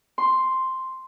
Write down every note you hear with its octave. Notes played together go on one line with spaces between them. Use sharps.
C6